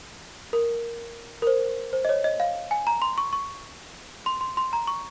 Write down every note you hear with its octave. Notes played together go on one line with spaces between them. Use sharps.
A#4
A#4
C5
C5
D#5
C#5
D#5
F5
G#5
A#5
C6
C#6
C#6
C6
C6
C6
A#5
C#6